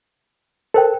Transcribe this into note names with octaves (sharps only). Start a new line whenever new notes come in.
A4 A#4 C5 G5